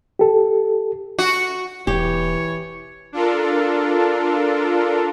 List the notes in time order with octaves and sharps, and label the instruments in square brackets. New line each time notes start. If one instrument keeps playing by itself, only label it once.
[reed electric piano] G4 A4
[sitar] F#4
[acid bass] E1 [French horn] E3 [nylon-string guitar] G4 [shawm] C#5
[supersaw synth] D4 F4 A4 A#4